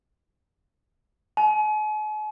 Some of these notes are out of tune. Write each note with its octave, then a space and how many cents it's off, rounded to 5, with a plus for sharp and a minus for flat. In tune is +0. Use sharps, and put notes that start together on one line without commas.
G#5 +45